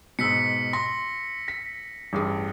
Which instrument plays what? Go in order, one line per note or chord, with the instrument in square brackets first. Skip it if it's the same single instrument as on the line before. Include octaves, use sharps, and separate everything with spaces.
[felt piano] G#2 B2 [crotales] E6 B6 C#7
[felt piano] C6 [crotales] A#6
[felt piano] B6
A1 G2 G#4